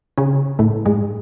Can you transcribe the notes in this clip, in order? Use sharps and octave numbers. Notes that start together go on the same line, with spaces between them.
C#3 C#4
A2 A3
G#2 G#3